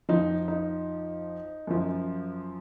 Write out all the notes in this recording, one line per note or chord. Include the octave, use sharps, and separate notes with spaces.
F2 F3 D#4
D#4
F#2 F3